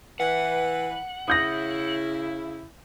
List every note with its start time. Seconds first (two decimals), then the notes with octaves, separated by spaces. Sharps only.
0.20 E3 B4 F#5
1.28 C#3 E4 D#6 G6 A#6